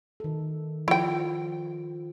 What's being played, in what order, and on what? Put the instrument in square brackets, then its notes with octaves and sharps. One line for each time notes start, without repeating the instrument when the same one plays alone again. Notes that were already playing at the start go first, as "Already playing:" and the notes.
[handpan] D#3 A4
[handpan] F3 [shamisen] E4 G5